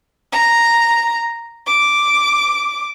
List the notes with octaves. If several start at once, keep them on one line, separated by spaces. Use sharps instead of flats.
A#5
D6